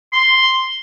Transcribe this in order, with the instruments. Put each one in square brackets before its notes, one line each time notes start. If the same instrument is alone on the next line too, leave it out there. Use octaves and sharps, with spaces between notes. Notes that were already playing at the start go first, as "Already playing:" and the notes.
[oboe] C6